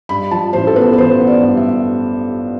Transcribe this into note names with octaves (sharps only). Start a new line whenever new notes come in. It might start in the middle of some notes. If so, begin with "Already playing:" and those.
G2 B5
F3 A5
A1 C5
A4
B3 B4
B4
A1 C5
B3
D5
G2
E5